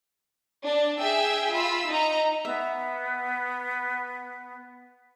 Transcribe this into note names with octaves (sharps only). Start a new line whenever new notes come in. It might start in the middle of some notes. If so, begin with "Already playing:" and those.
D4
G#4 E5 G5 E6
F4 B5 E6
D#4 D#5 A#5
B3 E5